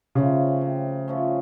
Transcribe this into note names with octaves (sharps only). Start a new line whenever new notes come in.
C#3 F3 A3 C#4
C3
F3 A3 C#4